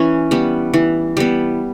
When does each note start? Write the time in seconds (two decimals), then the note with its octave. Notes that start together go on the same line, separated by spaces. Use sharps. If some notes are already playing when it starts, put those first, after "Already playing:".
Already playing: E3 C#4
0.31 G3 B3
0.74 E3
1.17 G3 B3